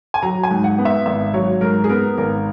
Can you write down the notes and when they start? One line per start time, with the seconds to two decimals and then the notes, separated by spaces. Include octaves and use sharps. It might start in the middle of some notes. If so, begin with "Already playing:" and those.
0.14 G#5
0.23 F#3 A#5
0.43 G#5
0.51 G#2
0.64 F#5
0.78 B3
0.85 E5
1.06 G#1 E5
1.34 F#3 C#5
1.61 G#2 A#4
1.84 G#4
1.89 B3 A#4
2.18 G#1 A#4